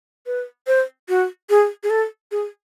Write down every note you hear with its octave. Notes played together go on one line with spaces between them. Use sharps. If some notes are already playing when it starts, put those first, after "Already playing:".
B4
C5
F#4
G#4
G#4
A4
G#4